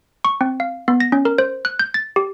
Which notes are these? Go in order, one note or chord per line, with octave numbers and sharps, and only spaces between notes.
C#6
C4
F5
B3
A#6
C#4
A#4
C5
F#6
G6
A6
G4